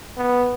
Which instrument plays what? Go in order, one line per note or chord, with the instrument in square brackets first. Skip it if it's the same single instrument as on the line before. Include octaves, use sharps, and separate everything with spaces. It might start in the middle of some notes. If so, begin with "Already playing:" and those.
[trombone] B3